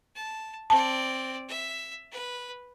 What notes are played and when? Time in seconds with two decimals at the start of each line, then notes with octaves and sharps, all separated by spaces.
0.15 A5
0.70 C4 D5 A5
1.48 E5
2.12 B4